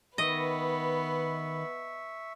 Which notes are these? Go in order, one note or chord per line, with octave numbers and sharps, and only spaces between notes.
D#3 B3 B4 D#5 E5 C#6